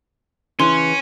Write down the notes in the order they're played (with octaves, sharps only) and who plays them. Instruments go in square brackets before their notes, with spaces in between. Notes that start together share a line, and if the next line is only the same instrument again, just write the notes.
[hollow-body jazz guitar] C#3 E3 [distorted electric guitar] C#4 [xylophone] C6